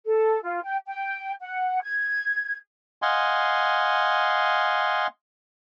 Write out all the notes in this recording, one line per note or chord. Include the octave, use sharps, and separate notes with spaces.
A4
F4
G5
G5
F#5
G#6
D#5 F5 F#5 G#5 C6